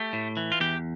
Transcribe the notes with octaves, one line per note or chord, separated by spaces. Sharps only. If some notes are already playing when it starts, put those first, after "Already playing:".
Already playing: A3 G4
A2
E3
F4
E2 G4